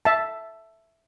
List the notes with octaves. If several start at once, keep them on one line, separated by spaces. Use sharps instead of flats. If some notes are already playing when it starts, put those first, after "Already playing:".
E5 A5